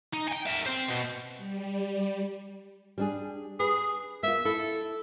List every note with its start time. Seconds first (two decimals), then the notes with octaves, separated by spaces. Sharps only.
0.13 D#4
0.27 G5 G#5
0.46 A#4 E5
0.66 C4 C5
0.88 B2
1.37 G3
2.98 G3 D4 G#4
3.60 G#4 B4
4.23 A#3 F4 E5
4.45 E4 A4